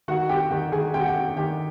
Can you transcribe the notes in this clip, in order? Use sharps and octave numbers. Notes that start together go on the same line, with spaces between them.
D#3 F#4 F#5
C3 G4 G5
D#3 G4 G5
D#3 G#4 G#5
C3 G5
F#5
G4 G5
C3
D#3 G4 G5